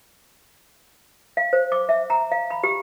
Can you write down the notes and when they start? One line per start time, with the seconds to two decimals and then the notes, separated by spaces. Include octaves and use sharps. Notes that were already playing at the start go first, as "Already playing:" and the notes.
1.37 F5
1.53 C5
1.72 D6
1.89 E5
2.10 A#5
2.32 F5
2.50 B5
2.64 G4